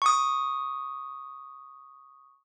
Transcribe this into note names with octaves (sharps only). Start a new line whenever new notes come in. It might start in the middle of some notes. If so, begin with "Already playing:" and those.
C#6 D#6